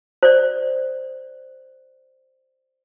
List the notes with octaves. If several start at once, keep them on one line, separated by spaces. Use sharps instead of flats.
C5 D5